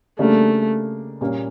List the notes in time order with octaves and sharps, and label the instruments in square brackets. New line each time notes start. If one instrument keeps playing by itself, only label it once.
[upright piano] C#3 G3 A#3 D4 [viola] A3
[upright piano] A#2 G3 A#3 C#4